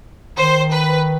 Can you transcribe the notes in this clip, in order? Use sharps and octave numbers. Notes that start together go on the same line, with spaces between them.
D#3 C5
B4